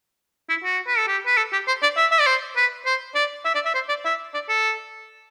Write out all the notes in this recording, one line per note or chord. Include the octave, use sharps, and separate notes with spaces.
E4
F#4
B4
A4
G4
B4
A4
G4
C5
D5
E5
E5
D5
C5
B4
C5
D5
E5
D5
E5
C5
D5
E5
D5
A4